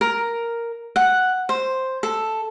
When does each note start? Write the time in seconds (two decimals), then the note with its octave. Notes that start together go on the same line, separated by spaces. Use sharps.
0.01 A#4
0.96 F#5
1.49 C5
2.03 A4